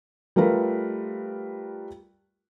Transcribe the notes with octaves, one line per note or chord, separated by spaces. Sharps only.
G3 A3 F4 A#4 B4